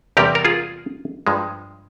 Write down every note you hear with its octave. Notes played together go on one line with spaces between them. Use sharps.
E2 C3 G3 G4 A#4
A#4
F4 G#4
G2 F3 G#3